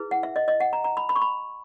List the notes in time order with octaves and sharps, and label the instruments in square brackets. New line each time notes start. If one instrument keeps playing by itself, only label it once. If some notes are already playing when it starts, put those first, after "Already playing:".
Already playing: [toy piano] E4 G#4 B4
F#5
E5
D#5
D#5
F#5
A#5
A#5
B5
B5
C#6
B5